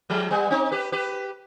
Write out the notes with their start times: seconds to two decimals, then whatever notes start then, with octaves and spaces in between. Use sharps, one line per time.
0.10 F3 G#3
0.30 G3 B3
0.50 C4 D#4
0.71 G4 B4
0.92 G4 B4